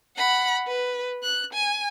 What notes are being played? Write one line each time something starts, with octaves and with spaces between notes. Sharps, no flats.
F#5 B5
B4
F#6
G#5